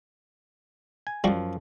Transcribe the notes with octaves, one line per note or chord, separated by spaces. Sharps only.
G#5
F#2 F3 G3 F#4